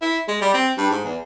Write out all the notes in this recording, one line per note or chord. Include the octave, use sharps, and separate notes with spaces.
E4
G#3
G3
C4
G2
G#2
E2